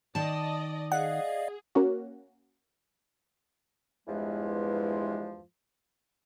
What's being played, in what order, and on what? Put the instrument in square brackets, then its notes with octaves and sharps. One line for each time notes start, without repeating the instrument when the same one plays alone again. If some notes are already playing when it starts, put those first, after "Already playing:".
[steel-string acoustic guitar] D#3 A5 [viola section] D5 D#5
[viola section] G#4 [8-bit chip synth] D5 D#5 F5 [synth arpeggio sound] F#5
[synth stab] A#3 C#4 F#4
[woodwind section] E2 G2 E3 F3 G#3